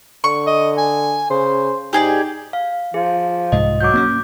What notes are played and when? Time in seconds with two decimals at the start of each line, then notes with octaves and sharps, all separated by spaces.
0.24 D3 C#6
0.47 D#5
0.77 G#5
1.30 C#3 C5
1.93 G#2 D#4 G4 G#4 D5
2.53 F5
2.94 F3 G#4
3.52 C2 G#2 D#5
3.81 F#3 D6 G6
3.94 A#3 B3 C#4